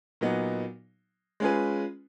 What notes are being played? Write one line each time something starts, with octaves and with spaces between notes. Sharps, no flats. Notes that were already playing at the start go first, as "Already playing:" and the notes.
A#2 F#3 B3 D#4
G#3 C#4 F4 G#4 B4